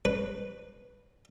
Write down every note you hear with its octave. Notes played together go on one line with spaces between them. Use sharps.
B4